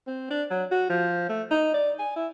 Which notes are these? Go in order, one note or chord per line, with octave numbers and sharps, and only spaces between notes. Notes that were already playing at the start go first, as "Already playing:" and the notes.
C4
D4
F#3
F#4
F3
A3
D#4
D5
G#5
E4